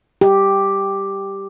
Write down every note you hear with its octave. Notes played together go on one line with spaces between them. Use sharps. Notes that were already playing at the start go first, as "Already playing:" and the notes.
G4